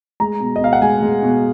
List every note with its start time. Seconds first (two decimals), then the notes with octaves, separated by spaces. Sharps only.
0.20 G#3 A#5
0.40 B2
0.56 D#5
0.61 B2 F5
0.73 F#5
0.82 G#3 G#5
1.02 G#3
1.23 B2